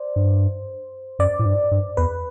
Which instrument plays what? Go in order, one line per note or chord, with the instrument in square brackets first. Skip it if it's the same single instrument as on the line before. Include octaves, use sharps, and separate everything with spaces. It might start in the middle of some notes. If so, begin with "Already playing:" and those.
Already playing: [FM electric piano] C5 D5
[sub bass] G2
[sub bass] F#2 [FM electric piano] D5
[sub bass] A2
G2
G2
[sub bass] E2 [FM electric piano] B4